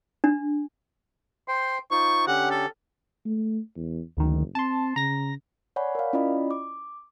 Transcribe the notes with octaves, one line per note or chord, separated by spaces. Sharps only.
D4
C5 G5 C6
D#4 F4 C5 C#6
D3 C#4 G4 F#5
A4
A3
E2
F#1 D2 D#3
C4 A5 C6
C#3 A#5 A#6
C#5 D5 F#5 G#5 B5
A#4 F5
C#4 E4 F4 D5 D#5 B5
D6